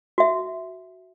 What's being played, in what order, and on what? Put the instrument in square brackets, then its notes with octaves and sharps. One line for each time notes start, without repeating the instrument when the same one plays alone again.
[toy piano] F#4 E5